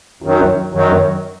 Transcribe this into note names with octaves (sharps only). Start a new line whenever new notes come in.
F#2 D#3 F#3
F#2 D#3 F#3